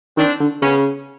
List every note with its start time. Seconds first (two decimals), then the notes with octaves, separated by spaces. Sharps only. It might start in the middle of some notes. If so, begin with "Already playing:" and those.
0.17 D#3 C4 D4
0.40 D3
0.62 C#3 B3 C#4